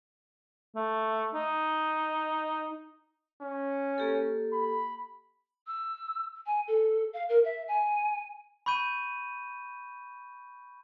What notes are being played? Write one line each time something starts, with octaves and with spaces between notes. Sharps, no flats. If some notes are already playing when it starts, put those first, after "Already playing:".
A3
D#4
C#4
A#3 G4 A4
B5
E6
G#5
A4
F5
A#4
E5
G#5
B5 C#6 G6 D#7